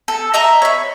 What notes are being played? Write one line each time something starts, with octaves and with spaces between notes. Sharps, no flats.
A4
D#5 E5 A#5
C#5 B5